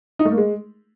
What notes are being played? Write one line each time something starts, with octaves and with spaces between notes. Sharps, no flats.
D#4
A3
A#3
G#3